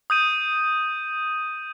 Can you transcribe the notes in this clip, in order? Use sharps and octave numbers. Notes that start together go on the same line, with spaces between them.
D#6 G6 D#7